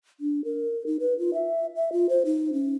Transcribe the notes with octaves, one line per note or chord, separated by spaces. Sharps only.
D4
A#4
D#4
B4
F4
E5
E5
F4
C5
D#4
C#4